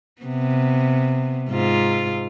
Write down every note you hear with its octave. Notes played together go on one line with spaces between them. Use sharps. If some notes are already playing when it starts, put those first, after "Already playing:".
C3 B3
G#2 F4